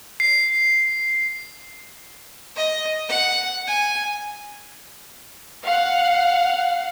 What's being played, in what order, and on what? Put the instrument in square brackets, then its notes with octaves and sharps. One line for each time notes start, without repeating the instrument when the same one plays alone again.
[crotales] C7
[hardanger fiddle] D#5
F#5
G#5
[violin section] F5 F#5